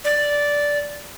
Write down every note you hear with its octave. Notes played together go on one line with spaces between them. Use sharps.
D5